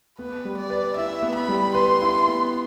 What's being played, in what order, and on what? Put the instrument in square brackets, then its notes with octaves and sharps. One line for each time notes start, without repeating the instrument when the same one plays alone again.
[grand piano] B3 [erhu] B4
[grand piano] G3
[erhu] D5
[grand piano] B4
[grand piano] E4 [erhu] E5
[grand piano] B3
[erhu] B5
[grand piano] G3
[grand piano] B4 [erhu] C6
[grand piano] E4
B3